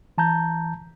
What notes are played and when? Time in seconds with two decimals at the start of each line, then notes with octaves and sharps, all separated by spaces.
0.18 E3 A5 A#5 G6